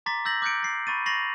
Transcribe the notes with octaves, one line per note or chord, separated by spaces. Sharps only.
A#5 C6 D6 A6 B6
E6 G6 A6 A#6 F#7
D6 F#6 G6 B6 C#7 D7
A6 C7
B5 C#6 A6 D#7
C#6 A6 A#6 C7 F7 F#7